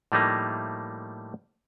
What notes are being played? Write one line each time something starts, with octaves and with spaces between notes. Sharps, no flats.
A2 F3 G3 A3 A#3 D#4